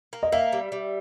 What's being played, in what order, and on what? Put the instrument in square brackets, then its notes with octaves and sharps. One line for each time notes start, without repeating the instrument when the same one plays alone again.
[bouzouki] A#3
[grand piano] D#5
[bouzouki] A#3 [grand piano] E5
[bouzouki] G3
G3